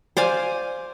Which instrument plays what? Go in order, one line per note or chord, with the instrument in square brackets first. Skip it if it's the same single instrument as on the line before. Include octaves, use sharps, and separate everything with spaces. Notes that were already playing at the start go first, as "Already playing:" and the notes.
[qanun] C5 D5 F5 G#5